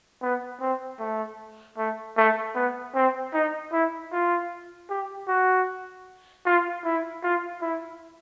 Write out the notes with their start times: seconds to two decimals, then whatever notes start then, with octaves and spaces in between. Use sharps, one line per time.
0.22 B3
0.61 C4
0.99 A3
1.78 A3
2.17 A3
2.55 B3
2.95 C4
3.34 D#4
3.72 E4
4.12 F4
4.90 G4
5.28 F#4
6.46 F4
6.85 E4
7.24 F4
7.62 E4